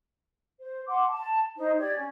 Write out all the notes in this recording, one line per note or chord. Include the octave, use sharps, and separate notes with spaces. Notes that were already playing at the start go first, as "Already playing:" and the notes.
C5
F#5 C6 D6
A5
D#4 C5
G4 D5 G#6
C#4